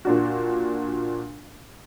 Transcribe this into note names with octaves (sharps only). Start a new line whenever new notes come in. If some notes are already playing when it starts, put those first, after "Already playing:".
A#2 D4 F#4